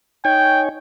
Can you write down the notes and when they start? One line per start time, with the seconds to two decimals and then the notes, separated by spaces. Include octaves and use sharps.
0.25 D#4 C#5 G5 G#5